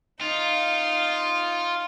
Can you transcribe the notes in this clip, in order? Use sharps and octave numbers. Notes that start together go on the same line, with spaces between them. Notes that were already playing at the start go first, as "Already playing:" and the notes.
D#4 F4 F5